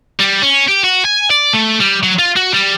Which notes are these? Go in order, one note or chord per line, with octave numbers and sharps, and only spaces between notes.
G3
C#4
G4
F#4
G#5
D5
A3
G3
F#3
F4
F#4
G3